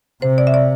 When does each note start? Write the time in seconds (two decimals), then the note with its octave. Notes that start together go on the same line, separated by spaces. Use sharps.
0.22 C3 C5
0.38 D5
0.47 E5
0.54 D5